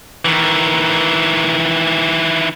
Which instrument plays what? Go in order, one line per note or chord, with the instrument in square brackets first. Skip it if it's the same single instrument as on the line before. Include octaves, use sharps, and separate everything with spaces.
[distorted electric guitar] D#3 E3